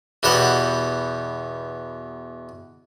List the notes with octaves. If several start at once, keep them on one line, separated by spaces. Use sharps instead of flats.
E2 B2 G4 C5 F#5